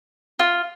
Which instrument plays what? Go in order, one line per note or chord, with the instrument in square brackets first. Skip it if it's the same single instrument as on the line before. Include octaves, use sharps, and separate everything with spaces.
[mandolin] F4